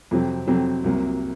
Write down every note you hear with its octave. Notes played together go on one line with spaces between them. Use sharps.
F2 C3 F#3 C4
F2 C3 F#3 C4
C2 C3 F#3 A#3